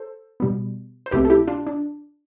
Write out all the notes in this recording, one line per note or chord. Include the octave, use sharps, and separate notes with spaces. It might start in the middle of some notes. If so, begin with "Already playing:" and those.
Already playing: A4 C5
B2 G3 B3
C5
C2 B2 A3 C4 G4 B4
A4
E4 G4
D4 F4
D4